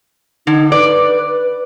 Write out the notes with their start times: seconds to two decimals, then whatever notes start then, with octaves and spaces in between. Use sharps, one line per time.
0.47 D3 D#4
0.72 B4 D5